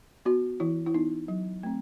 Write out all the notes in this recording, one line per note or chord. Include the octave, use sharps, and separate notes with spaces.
B3 F#4
E3 E4
E4
B3 D#4
F#3
A3 C4